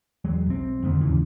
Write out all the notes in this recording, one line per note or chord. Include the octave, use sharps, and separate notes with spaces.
E2 F#3 G#3
B1 C4
F2 D3 D#3 A3
D#2 G#2 C#3 E3